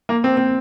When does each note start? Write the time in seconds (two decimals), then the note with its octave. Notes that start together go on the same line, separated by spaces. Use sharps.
0.09 A#3
0.24 C4
0.37 C4